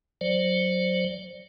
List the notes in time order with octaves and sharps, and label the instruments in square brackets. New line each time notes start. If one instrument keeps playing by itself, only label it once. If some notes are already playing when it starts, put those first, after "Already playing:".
[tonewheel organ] F#3 C5 D5